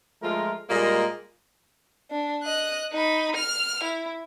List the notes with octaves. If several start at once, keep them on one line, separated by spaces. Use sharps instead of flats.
F3 G#3 A3 F4 A#4
A#2 G3 G#3 A#3 D#5 A#5
D4
D#5 F#6
D#4 B5
F6 F7
E4